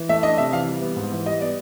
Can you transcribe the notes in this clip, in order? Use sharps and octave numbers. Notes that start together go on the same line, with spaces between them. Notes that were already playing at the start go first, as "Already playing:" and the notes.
Already playing: E3
A3 E5
D4 D#5
C3 E5
E3 F5
G3
B3
G#2
E3
G3 D#5
B3 D5